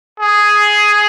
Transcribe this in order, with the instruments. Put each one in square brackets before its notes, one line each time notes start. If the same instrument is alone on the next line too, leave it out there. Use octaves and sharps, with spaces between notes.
[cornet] G#4